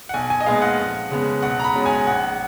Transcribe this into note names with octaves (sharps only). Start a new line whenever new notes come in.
F#5
B1 G#5
G#5
D#5
A#2 G#3 B3 F5
F#5
F2
C#3 G#3 B3
B1 F#5
A#5
B5
B2 G#3 C#4
G#5
A#1 F#5